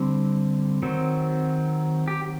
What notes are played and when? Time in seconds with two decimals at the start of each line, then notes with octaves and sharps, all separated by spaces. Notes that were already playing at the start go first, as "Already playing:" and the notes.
Already playing: D3 G3 C4
0.83 D#3 F#3 C4
2.08 G4